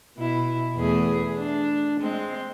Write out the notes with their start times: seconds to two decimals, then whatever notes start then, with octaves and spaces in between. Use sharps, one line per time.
0.17 B2 E4
0.76 E2 A3 G#4
1.34 D4
2.00 G#3 C4